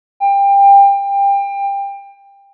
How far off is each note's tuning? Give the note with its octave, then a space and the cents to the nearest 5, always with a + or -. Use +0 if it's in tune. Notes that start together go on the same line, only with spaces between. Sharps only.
G5 +25